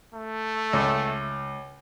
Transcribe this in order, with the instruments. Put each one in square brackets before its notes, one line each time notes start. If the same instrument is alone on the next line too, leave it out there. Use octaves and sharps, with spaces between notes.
[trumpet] A3
[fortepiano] C#2